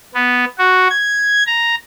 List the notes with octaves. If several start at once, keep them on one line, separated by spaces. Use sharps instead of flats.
B3
F#4
G#6
A#5